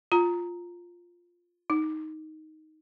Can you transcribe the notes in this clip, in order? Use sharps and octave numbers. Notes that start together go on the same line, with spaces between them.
F4 A#5
D#4